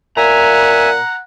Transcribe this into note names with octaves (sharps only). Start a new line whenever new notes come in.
A#2 E5 F#5 G#5 A#5